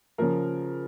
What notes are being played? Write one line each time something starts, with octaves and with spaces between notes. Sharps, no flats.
C#3 F3 A#4